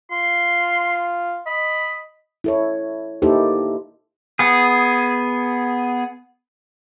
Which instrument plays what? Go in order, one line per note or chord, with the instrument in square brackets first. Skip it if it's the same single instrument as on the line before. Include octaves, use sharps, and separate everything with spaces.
[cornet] F4 [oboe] C6
[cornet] D#5 [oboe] B5
[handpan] E4 A4 C#5
A#3 D#4 E4 G4 A4 C5
[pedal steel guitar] B3 G#4